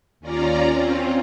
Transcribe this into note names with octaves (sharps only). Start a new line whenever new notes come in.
D#2 C#4 F4 D5 A#5
C4 C#4 F4